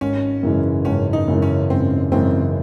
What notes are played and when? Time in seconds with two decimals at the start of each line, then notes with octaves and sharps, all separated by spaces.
0.01 G#1 C#4
0.43 F#2 C#3 E3 G#3
0.85 G#1 C#4
1.13 D#4
1.28 F#2 C#3 E3 G#3
1.42 C#4
1.70 G#1 C4
2.12 F#2 C#3 E3 G#3 C4